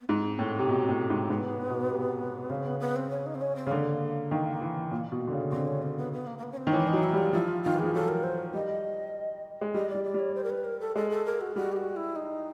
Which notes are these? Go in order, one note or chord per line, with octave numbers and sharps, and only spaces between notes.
B3
G#2 C4
A2
C3
B2
A2
G#2
G#2 B3
B2
C3
C#3 C4
B3
B3
C4
C#4
D#4
C4
C#4
C4
C#3
D3 A#3
D#3
E3
A#2
B2
D3
C#3
D3 C4
C#4
C4
B3
B3
A#3
A#3
B3
C#4
C4
D#3
E3 C#4
D#4
F#3
E4
G3
F4
F3 E4
F4
D#3 F4
E3
F3 G#4
F#3 A4
A#4
C5
G3 D#5
G#3
G3 D#5
D5
G3
D5
G3
C#5
C5
A#4
B4
A#4
A4
G#3 A4
A4
A#4
F#4
G3 F#4
G4
F#4
E4
D#4